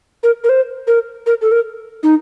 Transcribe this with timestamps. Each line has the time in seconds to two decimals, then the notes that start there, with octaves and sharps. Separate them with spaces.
0.23 A#4
0.44 A#4
0.49 C5
0.87 A#4
1.26 A#4
1.41 A4
1.51 A#4
2.03 D#4